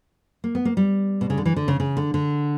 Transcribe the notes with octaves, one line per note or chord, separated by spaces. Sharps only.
A#3
B3
A#3
G3
B2
C#3
D3
E3
D3
C#3
C#3
D3
D3